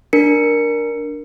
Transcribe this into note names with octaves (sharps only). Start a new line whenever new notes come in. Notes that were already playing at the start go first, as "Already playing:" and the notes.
D4 A#4 C#7